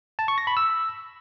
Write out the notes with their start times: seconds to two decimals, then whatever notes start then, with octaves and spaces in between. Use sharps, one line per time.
0.19 A5
0.28 C#6
0.38 A#6
0.47 B5
0.57 E6